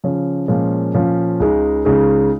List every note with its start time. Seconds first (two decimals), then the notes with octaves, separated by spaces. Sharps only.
0.04 C#3 F3 C#4
0.48 A#2 F3 G#3 C#4
0.95 A#2 F3 C#4
1.40 C#2 C#3 G#3 D#4
1.85 C#2 C#3 G#3 D#4